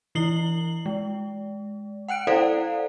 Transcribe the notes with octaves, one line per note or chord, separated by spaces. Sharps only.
E3 E4 C7 F#7 G7
G#3
F#5 G5 F#6 D7
E4 A4 C5 D5 F5 F#5